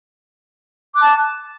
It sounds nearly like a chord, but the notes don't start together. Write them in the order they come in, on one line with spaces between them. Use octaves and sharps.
D6 F#6 A5